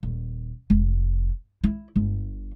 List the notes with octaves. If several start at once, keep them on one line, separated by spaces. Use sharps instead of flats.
D#1
F1
E4
G1